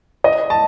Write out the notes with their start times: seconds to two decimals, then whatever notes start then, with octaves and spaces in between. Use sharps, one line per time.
0.24 D#5
0.50 A5